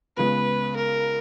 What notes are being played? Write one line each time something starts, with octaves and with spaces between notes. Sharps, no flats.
C#2 C#3 G#3 B3 B4
A#4